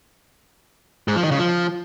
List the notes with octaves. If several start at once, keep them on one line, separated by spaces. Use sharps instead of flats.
G#2
F3
D#3
C#3
F3